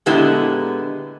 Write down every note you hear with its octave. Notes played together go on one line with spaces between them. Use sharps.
A#2 D3 G#3 B3 E4 G4